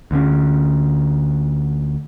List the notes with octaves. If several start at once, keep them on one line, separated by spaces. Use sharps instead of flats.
D2 D3 C#4